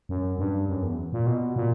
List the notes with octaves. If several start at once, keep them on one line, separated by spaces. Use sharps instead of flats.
F#2
G2
F#2
E2
A#2
B2
A#2